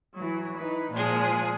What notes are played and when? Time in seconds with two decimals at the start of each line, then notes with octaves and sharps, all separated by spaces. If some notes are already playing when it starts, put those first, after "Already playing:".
0.15 E3 F#3
0.57 E3 D#4 B4
0.92 A#2 F3 G#3 G#4